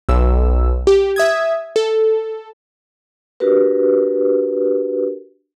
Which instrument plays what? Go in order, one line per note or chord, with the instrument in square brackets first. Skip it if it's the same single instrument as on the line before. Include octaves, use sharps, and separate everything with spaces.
[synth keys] B1 E6
G4
E5 D#6 G#6
A4
[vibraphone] D4 F#4 G4 A#4 B4